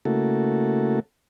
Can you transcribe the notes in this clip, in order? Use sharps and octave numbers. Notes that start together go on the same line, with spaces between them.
C#3 A3 A#3 E4 F#4 A4